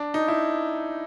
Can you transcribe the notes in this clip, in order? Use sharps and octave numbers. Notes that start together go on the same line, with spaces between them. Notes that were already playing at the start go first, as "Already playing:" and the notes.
Already playing: D4
D#4
E4